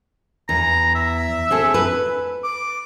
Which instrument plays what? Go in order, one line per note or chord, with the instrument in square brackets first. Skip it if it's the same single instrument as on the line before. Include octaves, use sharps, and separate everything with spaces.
[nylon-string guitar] E2 [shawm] A#5
[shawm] E5
[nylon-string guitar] C4 G#4 A4
B4
[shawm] D6